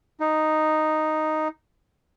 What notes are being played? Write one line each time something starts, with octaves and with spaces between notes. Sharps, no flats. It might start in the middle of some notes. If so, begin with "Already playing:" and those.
D#4